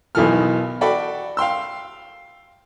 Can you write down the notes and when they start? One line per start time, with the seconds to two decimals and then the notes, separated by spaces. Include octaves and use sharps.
0.15 B1 B2 D#3 E3 A4 F6
0.81 F#4 A4 D5 G5 B5
1.37 F5 G5 C6 E6